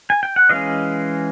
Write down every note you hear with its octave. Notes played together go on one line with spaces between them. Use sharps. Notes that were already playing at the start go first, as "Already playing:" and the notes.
G#5
G5
F#5
E3 G#3 C#4 D#5 F5